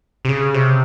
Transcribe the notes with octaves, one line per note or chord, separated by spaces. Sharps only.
C3
C#3
C3